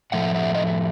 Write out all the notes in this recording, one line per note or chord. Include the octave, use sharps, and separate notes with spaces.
A2 F3 A3 E5 F#5
E5 F#5
D#5
E5